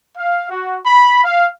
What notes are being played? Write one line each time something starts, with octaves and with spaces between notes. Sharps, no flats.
F5
F#4
B5
F5